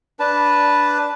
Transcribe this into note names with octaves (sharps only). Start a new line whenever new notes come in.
D4 B4 A5